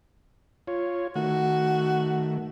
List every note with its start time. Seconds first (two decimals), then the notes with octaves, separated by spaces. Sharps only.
0.67 F4 C#5
1.16 D#3 A3 F#4